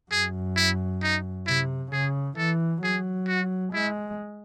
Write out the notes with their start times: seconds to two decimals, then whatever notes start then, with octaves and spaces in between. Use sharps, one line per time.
0.11 F#2 G#4
0.56 E4
1.03 D#4
1.47 C3 E4
1.93 C#3 G#4
2.37 E3 A4
2.83 F#3 G#4
3.28 F#4
3.73 G#3 E4